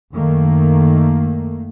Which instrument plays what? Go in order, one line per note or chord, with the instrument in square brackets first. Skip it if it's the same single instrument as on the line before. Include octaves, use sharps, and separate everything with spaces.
[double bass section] F#2 D#3 A3 A#3